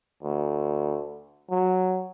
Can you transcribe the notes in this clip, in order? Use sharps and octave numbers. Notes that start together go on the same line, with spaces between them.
D2
F#3